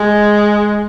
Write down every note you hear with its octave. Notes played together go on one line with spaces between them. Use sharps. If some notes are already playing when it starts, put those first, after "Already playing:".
Already playing: G#3